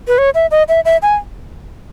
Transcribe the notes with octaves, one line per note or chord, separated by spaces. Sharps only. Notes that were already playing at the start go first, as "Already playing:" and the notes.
B4
C#5
E5
D#5
E5
E5
G#5